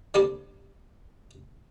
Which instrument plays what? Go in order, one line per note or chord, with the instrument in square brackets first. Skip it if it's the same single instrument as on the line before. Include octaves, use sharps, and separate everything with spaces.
[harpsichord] D3 G3 A#3 C4 G4